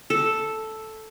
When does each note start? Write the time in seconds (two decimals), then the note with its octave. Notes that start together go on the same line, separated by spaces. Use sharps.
0.10 A4